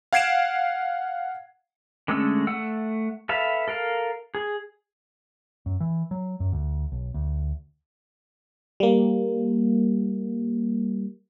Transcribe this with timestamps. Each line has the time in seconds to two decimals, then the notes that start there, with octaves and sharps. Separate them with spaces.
0.13 F5 F#5 G#6 C7 D7 E7
2.08 D3 G#3 A3 C#4 E6
2.47 A3 F#5 E6
3.29 A4 B4 E5 F5
3.68 A4 A#4 F5
4.35 G#4
5.66 F#2
5.81 E3
6.11 F#3
6.40 F#2
6.52 D2
6.92 B1
7.14 D2
8.80 G3 A#3